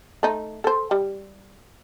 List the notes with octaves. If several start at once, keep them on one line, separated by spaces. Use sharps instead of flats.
A3 D#4
A4 C5
G3